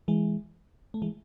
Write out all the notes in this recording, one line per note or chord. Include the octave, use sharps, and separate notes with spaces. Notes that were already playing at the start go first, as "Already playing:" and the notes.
E3 G#3
A3
E3 G#3